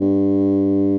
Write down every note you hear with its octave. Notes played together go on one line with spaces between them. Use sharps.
G2